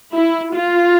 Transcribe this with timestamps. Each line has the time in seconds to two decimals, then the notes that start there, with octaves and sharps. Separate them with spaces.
0.13 E4
0.54 F4